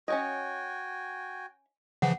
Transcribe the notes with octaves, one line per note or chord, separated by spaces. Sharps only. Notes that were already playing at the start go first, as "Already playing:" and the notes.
C#4 F#4 C#5 D#5 G5 G#5
C#3 E3 F3 F#5